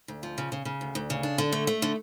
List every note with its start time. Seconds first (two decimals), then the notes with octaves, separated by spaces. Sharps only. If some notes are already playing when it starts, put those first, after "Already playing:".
0.08 D2
0.23 F3
0.38 C#3
0.52 C#3
0.65 C#3
0.81 D2
0.95 D2
1.10 C#3
1.23 D4
1.38 D3
1.52 A3
1.67 A3
1.82 D3